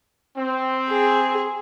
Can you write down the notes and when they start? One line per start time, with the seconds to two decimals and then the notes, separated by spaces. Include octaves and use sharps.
0.37 C4
0.89 G#4